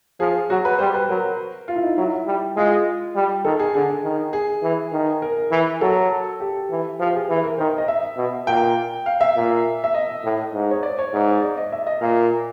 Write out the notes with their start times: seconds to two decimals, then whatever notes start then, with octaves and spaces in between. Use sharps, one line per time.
0.20 F3 G#4
0.50 F#3 F#4
0.65 B4
0.79 G3 C5
0.94 B4
1.08 F#3 A#4
1.68 F4
1.76 E4
1.83 D#4
1.98 F#3 E4
2.27 G3
2.56 G#3 F4
3.16 G3
3.45 D#3 A4
3.59 G#4
3.74 D3 G#4
4.03 D#3
4.33 G#4
4.63 E3
4.92 D#3
5.22 A#4
5.51 E3
5.81 F#3 A4
6.40 G4
6.70 E3
7.00 F3 G4
7.14 G#4
7.29 E3
7.44 A#4
7.58 D#3 C5
7.78 D#5
7.88 E5
8.17 B2
8.47 A#2 G5
9.06 F5
9.21 E5
9.36 A#2
9.84 E5
9.94 D#5
10.24 A2
10.53 G#2
10.71 C#5
10.83 D5
10.99 C#5
11.13 G#2
11.42 D5
11.57 D#5
11.72 E5
11.87 D#5
12.01 A#2 F5